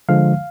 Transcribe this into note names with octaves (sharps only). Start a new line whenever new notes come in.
D3 F3 G#3 F5